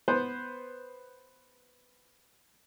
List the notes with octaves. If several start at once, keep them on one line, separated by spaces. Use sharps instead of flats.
B3 B4 C5